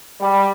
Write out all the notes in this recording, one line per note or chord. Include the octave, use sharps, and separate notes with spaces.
G3